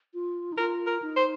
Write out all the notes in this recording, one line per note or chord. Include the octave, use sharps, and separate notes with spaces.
F4
D#4
F4 A#4
A#4
D#4
C5